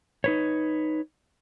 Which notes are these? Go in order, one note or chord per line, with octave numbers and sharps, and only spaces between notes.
D#4 B4 C#5